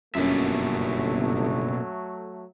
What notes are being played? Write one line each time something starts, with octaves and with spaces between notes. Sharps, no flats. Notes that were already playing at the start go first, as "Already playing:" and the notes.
G1 F#2 B2 F#3 A3 A#3 C#4 E5